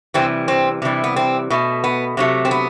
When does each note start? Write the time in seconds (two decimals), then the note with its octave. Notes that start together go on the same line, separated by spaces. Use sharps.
0.14 C3 E3 G3 C4
0.48 C4
0.82 C3 E3 G3
1.04 B3
1.16 C4
1.50 B2 A3
1.84 B3
2.17 C3 F#3 A3
2.45 C4
2.51 B3